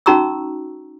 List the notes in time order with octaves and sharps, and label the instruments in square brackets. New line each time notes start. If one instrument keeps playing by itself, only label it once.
[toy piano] C#4 D#4 F#4 A#5 C#6 E6